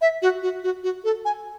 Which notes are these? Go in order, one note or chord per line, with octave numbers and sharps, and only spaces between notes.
E5
F#4
F#4
F#4
F#4
A4
G#5